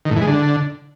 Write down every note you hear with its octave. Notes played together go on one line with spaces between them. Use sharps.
D#3
A2
E3
G#3
D3